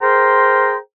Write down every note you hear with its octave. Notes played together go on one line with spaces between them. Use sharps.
G#4 A#4 C5 G5 A#5 C6